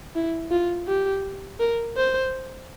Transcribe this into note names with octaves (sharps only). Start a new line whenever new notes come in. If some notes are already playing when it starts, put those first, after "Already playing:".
E4
F4
G4
A#4
C5